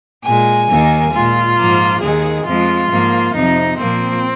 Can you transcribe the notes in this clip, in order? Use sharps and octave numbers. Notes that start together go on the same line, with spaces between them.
A#2 G#3 G#5
D#2 D#3 A#3
A#2 G#3 F4
G#2 F3 A#3
D#2 D#3 G#3 G#4
F2 F3 G#3 F4
G#2 F3 A#3
F2 C3 F3 D#4
A#2 F3 A#3 C4